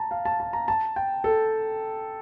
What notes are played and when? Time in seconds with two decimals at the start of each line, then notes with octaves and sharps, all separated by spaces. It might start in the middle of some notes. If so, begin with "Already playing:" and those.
Already playing: A5 A#5
0.11 F5
0.25 A5
0.40 A5
0.53 A#5
0.68 A5
0.96 G5
1.24 A4